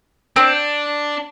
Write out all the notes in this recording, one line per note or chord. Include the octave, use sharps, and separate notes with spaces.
C4 D4